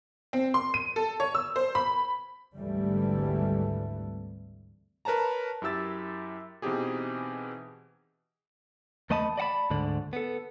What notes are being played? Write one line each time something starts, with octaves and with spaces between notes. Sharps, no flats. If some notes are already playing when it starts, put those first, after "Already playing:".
C4
C6
D#7
A4
C#5
E6
C5
B5
G#1 D2 E3 G3 A3
A#4 B4 C#5 A5 A#5
F#2 E4 G4 E6 A6
B2 E3 C4 D#4 G4 G#4
E2 A3 D#5 A5 B5
D5 D#5 F#5 A5 B5
D2 G#2 D3 D5
B3 A4